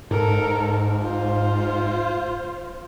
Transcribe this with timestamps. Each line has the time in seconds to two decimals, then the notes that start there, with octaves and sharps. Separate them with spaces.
0.11 G#2 A4 A#4
1.01 F4 C5